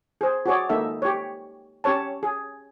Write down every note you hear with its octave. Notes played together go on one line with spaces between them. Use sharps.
G#4 C5
F#4 G#4 C#5 D5
G#3 A#3 D#4 A4 E5
G4 C#5
C#4 G4 C#5 A5
G#4